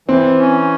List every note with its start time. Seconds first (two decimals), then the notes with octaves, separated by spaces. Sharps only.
0.08 E3 C4
0.39 C#4